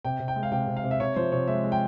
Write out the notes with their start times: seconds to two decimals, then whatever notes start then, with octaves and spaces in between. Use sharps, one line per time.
0.05 C3 G5
0.20 C3
0.28 G5
0.36 G#3
0.43 F5
0.52 C3 G5
0.68 C3
0.76 F5
0.84 C3
0.91 E5
1.00 C3 C#5
1.16 F3 C5
1.32 C3 C#5
1.48 G#3 E5
1.64 G#3
1.72 G5